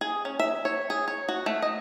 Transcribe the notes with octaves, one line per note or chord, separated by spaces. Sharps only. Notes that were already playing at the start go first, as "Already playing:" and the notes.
G#4
C#4
E5
C#5
G#4
C#5
F#4
A3
D#5